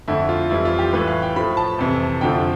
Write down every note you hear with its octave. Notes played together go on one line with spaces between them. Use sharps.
F2 D3 A3 E4
F4
F2 E3 G3 E4
F4
G4
A2 E3 A3 B4
F5
G5
A2 F3 A3 B5
A5
F2 C3 E3
F2 D3 F3 A3 G5